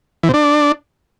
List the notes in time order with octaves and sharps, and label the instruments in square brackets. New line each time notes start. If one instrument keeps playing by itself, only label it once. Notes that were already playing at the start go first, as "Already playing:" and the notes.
[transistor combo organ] E3
C3
D4